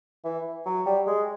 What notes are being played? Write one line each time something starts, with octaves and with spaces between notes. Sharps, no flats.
E3
F#3
G3
G#3